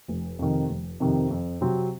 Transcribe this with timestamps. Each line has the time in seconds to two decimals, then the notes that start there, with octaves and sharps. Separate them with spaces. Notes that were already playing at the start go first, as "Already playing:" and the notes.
0.08 F1
0.39 F2 C3 D#3
0.69 F1
1.00 F2 C3 D#3
1.31 F2
1.61 C3 F#3 C4